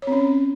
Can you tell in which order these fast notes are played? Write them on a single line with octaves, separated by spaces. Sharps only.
C#5 C4 C#4